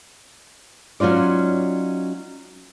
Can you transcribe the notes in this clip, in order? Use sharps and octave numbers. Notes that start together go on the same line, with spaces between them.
F#3 C#4 D#4 F4 D5